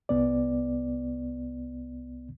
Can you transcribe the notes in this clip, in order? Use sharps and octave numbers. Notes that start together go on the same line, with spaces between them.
C2 B3 D5